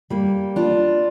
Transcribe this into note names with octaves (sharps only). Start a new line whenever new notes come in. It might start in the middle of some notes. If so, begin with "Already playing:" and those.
G3 A#3
D4 F4